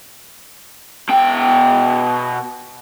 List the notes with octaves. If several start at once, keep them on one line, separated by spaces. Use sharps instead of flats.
B2 G5